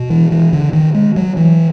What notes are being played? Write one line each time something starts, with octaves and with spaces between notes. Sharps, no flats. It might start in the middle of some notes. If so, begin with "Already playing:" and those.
Already playing: B2
E3
E3
D3
D#3
G#3
F#3
E3